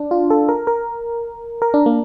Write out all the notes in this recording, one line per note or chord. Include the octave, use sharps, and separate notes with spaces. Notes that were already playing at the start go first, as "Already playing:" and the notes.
Already playing: D4
F4
A4
A#4
A#4
A#4
D4
A#3